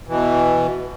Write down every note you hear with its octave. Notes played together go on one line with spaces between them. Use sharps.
B2 E3